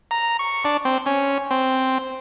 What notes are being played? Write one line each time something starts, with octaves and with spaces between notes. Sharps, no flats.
A#5
C#6
D4
C4
C#4
C4